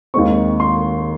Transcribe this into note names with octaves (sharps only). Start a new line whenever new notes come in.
D#2 D#3 G#3 C4 C#6
C6